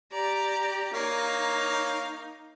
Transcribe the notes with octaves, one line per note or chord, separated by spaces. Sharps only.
G4 D5 A#5
A#3 D#4 C#5 F5